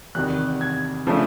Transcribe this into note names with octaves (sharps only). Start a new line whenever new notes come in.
E2 C3 D#3 G3 F#6
G#6
C#3 F3 A3 D4